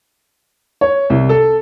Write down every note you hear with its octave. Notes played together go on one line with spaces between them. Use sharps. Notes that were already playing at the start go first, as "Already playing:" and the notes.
C#5
C2
A4